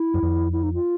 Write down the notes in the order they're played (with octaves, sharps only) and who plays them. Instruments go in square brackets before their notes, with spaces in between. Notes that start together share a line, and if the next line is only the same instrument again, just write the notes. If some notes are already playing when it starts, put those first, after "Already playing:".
Already playing: [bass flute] E4
[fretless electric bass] F#2
F2
[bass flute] E4
D#4
F4